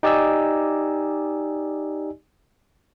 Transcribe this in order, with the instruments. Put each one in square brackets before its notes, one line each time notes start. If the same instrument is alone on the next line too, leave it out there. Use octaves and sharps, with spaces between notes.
[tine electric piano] D#4 G4 D5 D#5 G#5 E6